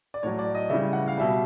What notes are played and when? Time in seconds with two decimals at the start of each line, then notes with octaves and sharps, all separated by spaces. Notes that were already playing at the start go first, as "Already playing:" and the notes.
0.14 D5
0.23 A2 F#3 C#5
0.39 D5
0.55 D#5
0.70 C#3 E5
0.72 E3 G3
0.93 F#5
1.07 F5
1.17 B2 G3 E5